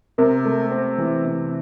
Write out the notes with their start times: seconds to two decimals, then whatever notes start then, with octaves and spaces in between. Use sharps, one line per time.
0.18 C3 A#4
0.45 A3
0.71 C4
0.98 E3
1.25 C3